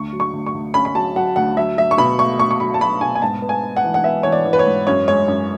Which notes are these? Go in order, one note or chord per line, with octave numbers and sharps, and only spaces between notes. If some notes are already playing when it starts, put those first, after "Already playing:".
Already playing: D2 C#6
F#3
C#6
D2
C#6
D2
C#4 B5
B5
F#3 A5
F#3 F#5
D2 F#5
F#3 E5
F#3 E5
C#6
B2 B5
A3 C#6
A3 C#6
C#6
F#3 B5
A5
F#3 B5
B2 G#5
G#5
G#2 A5
B3
G#5
B3
F#5
E3
F#5
B3 E5
E3 C#5
D5
E3
B4
C#5
G#2
F#2 C#5
G#3 C#5
F#2